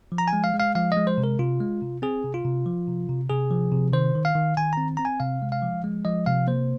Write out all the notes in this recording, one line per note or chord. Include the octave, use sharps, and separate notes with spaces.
F3
A#5
G#5
G#3
F5
G#3
F5
F3 F5
G#3 D#5
C5
C3
A#4
C3 F4
G#3
C3
C4 G#4
C3
F4
C3
F3
C3
C3
C3 G#4
F3
C3
D#3 C5
D#3
F5
D#3
D#3 G#5
C4 A#5
C4 A#5
G#5
C3 F5
G#3
F5
F3
G#3
F3 D#5
C3 F5
A#3 C5